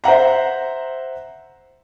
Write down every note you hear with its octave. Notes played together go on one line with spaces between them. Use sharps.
C5 E5 F#5 A#5